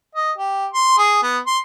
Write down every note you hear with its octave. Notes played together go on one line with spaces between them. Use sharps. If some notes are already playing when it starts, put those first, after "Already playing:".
D#5
G4
C6
G#4
B3
C6